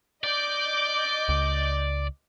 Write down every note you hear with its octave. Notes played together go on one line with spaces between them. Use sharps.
D5 D#5 D6 G6
C#2